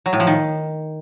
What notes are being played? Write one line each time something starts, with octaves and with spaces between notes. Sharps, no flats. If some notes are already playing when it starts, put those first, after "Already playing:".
F#3
A2
F3
D#3